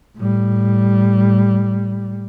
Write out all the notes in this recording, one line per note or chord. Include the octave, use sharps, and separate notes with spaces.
A2 G3